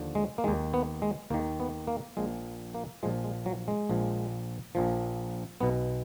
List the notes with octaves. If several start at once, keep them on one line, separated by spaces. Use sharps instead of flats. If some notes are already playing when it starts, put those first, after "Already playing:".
Already playing: D#2 D3 F3
G#3
A#3
D#2 D#3 G#3
B3
G#3
D#2 D#3 A#3
B3
A#3
A#1 A#2 F3 G#3
A#3
A#1 A#2 F3 G#3
G#3
F#3
G#3
A#1 A#2 F3
A#1 A#2 F3
B1 B2 B3